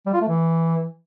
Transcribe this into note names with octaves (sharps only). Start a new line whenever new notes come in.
G3
F4
A3
E3